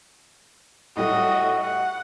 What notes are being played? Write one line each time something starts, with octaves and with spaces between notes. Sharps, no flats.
A2 G3 A3 F#4 D#5
F#5